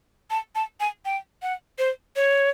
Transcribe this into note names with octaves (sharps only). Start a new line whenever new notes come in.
A5
A5
G#5
G5
F#5
C5
C#5